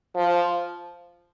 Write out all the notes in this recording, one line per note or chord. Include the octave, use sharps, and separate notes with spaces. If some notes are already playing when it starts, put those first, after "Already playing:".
F3